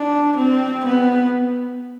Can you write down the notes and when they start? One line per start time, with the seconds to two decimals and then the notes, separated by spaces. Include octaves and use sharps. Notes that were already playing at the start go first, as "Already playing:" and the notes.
Already playing: D4
0.36 C4
0.85 B3